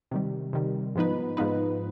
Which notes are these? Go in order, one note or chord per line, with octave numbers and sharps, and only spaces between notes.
C3 D#3 G3
C3 D#3 G3
G#2 F3 B3 D#4 B4
G#2 F3 B3 D#4 B4